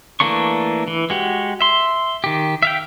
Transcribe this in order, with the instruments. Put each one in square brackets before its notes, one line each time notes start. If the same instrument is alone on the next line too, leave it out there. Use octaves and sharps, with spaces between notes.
[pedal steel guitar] E3 A3 A#3 D4 C#6
E3
G#3 F#4 G4
E5 C6
D#3 G4
E5 F5 G5